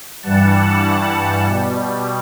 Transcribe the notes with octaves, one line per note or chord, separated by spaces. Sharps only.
G2 E3 G3 F#5 A5
B2 G3